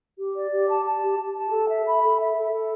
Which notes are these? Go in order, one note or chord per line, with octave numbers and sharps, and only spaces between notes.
G4
D5
G4
A5
A5
G4
G4
A5
A4
E5
B5
A4
E5
A4
A4